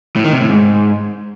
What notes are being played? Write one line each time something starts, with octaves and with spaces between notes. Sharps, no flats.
A2
D#3
C3
A2
G#2